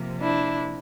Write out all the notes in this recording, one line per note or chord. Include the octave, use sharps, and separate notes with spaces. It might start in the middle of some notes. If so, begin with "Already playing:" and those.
Already playing: C3 F3 A#3
D4 E4